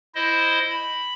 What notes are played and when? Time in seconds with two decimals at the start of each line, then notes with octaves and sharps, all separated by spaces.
0.15 E4 C5 D#5
0.70 B5